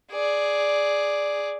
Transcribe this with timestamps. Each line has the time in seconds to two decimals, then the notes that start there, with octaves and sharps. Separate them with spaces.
0.11 G#4 D5